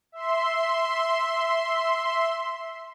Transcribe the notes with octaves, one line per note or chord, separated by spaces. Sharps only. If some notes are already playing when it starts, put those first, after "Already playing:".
E5 C6